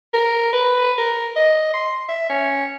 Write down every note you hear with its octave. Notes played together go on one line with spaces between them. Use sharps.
A#4
B4
A#4
D#5
C6
E5
C#4